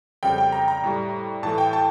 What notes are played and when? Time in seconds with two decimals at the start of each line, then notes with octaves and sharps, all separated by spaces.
0.23 F2 C#3 G3 G5
0.38 G5
0.52 A#5
0.68 A#5
0.83 A2 G3
1.43 A2 E3 A3 A5
1.58 G5
1.73 A5